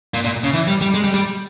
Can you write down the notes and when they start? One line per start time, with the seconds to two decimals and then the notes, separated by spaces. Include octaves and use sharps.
0.14 A#2
0.24 A#2
0.44 C#3
0.53 E3
0.67 G3
0.81 G3
0.94 G#3
1.04 G3
1.14 G3